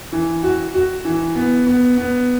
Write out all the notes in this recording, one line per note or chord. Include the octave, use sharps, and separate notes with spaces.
E3
F#4
F#4
E3
B3
B3
B3